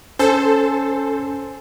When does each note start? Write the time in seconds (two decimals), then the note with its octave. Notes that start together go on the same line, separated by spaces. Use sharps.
0.19 C#4 A4 C5 G#5